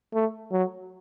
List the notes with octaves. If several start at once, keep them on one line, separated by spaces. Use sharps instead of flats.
A3
F#3